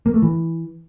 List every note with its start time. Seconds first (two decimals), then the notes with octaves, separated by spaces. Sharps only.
0.06 A#3
0.14 A3
0.22 E3